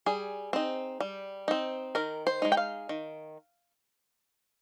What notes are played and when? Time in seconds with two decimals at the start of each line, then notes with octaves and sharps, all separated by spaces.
0.06 G3 G#4
0.53 C4 D#4
1.00 G3
1.48 C4 D#4
1.95 D#3 A#4
2.27 C5
2.42 G#3 D#4
2.52 G5
2.57 F5
2.89 D#3